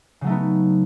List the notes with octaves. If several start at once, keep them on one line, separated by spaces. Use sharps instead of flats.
C#3 F#3 A3 B3 D#4